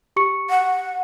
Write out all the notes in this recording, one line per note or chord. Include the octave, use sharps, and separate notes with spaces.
G4 C#6 C#7
F#5